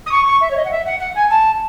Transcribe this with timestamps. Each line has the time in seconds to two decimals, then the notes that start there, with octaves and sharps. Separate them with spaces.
0.06 D#6
0.11 C#6
0.26 C#6
0.40 E5
0.50 C#5
0.56 D#5
0.64 F#5
0.71 E5
0.85 F#5
0.99 F#5
1.15 G#5
1.29 A5